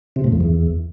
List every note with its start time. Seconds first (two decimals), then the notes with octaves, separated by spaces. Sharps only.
0.16 C3
0.24 A2
0.32 F2
0.40 E2